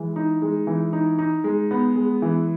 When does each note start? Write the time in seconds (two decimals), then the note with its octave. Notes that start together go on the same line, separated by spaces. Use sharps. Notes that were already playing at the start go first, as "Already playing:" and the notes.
Already playing: E3 G#3
0.16 D#4
0.42 G#3
0.67 E3
0.93 D#4
1.19 D#4
1.44 G#3
1.71 B3
1.96 G#3
2.22 E3